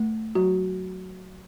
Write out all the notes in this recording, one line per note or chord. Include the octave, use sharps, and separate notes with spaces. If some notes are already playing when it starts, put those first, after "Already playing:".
Already playing: A3
F#3 F#4